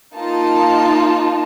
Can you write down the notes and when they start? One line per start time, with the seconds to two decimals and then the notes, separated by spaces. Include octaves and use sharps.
0.15 A#3 D#4 F4 A5